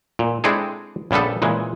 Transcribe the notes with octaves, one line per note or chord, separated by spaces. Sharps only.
A#2
G#3 C4 D4 E4 G#4 A4
A#1 C#3 G3 B3 A4
A#2 C#3 E3 G#3